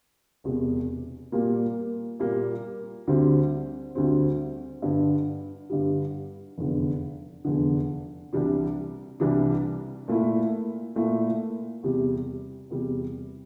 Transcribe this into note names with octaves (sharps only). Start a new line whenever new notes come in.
E1 E2 C3
A#2 G3 A#3
A#2 G3 A#3
D2 D3 G3 C4
D2 D3 G3 C4
G2 D3 G3
G2 D3 G3
F1 E2 D3
F1 E2 D3
C2 C3 E3 G3 D4
C2 C3 E3 G3 D4
A#2 A3 E4
A#2 A3 E4
E2 C3 G3
E2 C3 G3